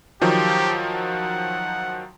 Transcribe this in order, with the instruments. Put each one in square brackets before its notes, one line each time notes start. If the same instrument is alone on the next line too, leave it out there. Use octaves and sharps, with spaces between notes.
[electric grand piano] D#3 F3 F#3 [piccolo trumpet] G4
[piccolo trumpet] F#5